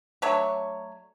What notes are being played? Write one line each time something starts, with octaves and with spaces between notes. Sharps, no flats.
F#3 A3 D4 C#5